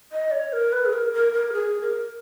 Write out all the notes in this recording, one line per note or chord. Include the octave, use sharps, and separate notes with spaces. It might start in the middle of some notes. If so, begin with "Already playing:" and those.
D#5
C#5
A#4
B4
G#4
A#4
A#4
A#4
G#4
A#4